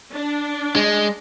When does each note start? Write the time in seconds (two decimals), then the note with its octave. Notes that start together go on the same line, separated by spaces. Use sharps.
0.13 D4
0.76 G#3